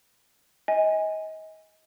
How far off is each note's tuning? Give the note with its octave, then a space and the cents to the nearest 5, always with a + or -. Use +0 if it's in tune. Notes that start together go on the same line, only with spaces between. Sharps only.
D#5 +30 G#5 -15